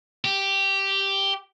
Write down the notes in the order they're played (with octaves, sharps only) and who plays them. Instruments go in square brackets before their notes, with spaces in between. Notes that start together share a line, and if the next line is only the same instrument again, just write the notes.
[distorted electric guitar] G4